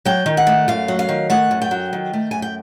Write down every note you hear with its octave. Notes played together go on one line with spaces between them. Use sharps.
F#3 G5
D#3
F#5
A3
F#2 F5
F#3
F5
D#3
A3 F#5
F#2
G5
F#3
D#3
A3
F#2 G#5
G5